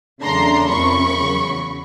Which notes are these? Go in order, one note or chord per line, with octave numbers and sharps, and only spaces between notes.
E2 C#3 F#3 A3 D4 A#5 C6
F2 C3 F3 A#3 C#4 B5 C#6
E2 C#3 F#3